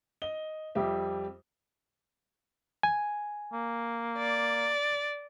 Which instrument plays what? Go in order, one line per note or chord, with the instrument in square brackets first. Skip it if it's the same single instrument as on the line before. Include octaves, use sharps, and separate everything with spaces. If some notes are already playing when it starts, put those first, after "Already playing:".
[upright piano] D#5 G7
F2 G3 G4 E5
[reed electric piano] G#5
[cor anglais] A#3
[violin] D5